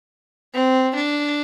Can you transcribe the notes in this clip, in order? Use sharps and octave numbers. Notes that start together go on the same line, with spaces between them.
C4
D4